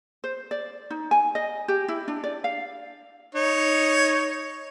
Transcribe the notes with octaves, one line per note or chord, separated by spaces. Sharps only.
C5
D5
D#4
G#5
D#5
G4
E4
D4
D5
F5
D#4 C#5